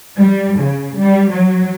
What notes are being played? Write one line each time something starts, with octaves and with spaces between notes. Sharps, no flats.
G3
C#3
G3
F#3